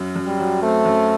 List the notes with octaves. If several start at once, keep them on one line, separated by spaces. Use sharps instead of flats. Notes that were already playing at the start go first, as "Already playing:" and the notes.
Already playing: F#2
F#2
G3
F#3
A3 C4
F#2